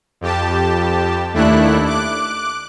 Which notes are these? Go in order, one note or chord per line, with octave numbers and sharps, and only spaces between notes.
F2 G4 A5
D#2 A3 D4 E4 F#6
D6 F#6